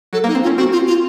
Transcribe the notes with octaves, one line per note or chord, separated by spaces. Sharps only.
F#3 A4
A#3
D#4
C4
F4
C#4
C4 F#4
F4
F4